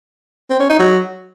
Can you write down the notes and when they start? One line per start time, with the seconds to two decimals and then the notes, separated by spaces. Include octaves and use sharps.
0.50 C4
0.60 C#4
0.69 D#4
0.79 F#3